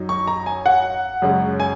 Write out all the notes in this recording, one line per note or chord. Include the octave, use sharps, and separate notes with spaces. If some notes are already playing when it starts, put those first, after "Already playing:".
Already playing: F#2 F#3 D#4
C#6
A#5
G#5
F#5
F#2 C#3 G#3 C#4
G#5